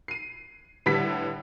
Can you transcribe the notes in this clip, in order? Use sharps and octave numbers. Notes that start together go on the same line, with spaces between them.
C7 D#7
A2 D3 G3 B4 B6